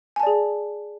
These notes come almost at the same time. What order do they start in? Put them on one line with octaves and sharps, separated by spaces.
G#5 A5 D5 G#4